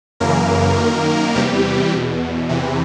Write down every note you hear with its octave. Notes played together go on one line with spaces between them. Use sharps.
F#2 C#3 E3 A#3 A#4
F#2 D#3
E2 C3 E3 G3 G4
E2 B2
E2 C3 E3